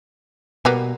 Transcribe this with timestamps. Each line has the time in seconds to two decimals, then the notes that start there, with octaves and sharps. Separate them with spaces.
0.65 B2 G3 A#3 B3